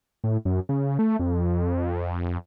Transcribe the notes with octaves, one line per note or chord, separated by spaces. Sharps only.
A2
F#2
C#3
A3
F2